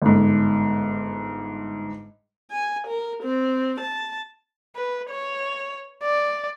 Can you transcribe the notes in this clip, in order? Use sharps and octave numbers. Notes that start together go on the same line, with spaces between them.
G1 G#2
G#5
A#4
C4
A5
B4
C#5
D5